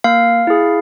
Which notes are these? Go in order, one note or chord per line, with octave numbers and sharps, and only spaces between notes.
A#3 F5
E4 G#4